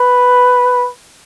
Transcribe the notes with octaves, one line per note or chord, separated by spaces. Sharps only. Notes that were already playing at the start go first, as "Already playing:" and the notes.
Already playing: B4